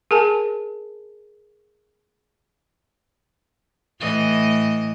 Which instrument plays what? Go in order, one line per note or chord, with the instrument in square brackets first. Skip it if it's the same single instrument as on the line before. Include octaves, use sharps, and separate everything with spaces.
[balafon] G#4 A#4 G#5 A5
[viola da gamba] A2 E3 D#5